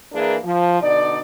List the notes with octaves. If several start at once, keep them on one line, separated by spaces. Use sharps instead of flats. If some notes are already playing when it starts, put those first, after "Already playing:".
E3 A#3 D4 G#4 A#4
F3
B2 D3 D#4 D5